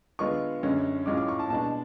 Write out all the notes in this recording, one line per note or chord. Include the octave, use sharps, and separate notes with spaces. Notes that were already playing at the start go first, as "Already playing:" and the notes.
D3 G#3 B3 F4 C#6
F#2 D3 G#3 C#4
A2 G#3 C#4 F4 D6
D6
C#6
A5
B2 G#3 D4 A5